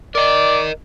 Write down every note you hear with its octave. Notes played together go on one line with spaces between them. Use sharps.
A#4 D5 D#5